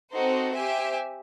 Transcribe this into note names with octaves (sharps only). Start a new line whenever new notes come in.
C4 D#4 F#4 A4 C5
G4 C5 E5 G#5